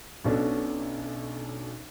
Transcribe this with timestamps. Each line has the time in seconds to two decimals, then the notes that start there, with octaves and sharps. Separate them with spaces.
0.24 B1 B2 C#4 D4 A4